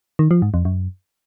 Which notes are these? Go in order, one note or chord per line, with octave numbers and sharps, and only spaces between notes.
D#3
F3
G#2
F2
F#2